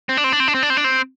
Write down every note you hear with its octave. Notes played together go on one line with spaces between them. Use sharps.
C4
D4
C4
D4
C4
D4
C4
D4
C4
D4
C4